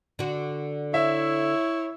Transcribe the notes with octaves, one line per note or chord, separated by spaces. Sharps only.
D3 F#4
E4 C#5 E5